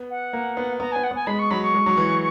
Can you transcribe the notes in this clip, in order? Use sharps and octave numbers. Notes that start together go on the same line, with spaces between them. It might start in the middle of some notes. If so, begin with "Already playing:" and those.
Already playing: B3
F#5
A#3
B3
B3 A#5
B3 G#5
F#5
B3 G#5
G#3 B5
C#6
F#3 B5
C#6
G#3
F#3
E3
E3